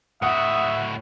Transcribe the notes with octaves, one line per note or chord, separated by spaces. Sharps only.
A2 F#4 E5 F#5 D#6